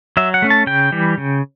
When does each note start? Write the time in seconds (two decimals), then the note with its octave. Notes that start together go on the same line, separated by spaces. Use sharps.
0.17 F#3 E5
0.34 F#5
0.42 A3 C#4
0.50 A5
0.67 C#3 G5
0.92 E3 G3
1.18 C#3